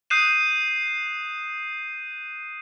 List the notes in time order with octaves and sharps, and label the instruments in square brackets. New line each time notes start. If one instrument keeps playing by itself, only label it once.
[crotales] D#6 F#6 G6 C7 D#7 E7